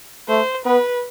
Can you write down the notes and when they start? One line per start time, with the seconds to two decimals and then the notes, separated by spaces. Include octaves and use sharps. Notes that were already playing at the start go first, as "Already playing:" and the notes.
0.28 A3 C5
0.66 B3 B4